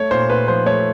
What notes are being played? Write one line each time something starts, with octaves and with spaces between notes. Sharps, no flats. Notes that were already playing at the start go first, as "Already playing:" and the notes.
Already playing: A3 C#5
A#2 C5
A#2 B4
F3 C5
A3 C#5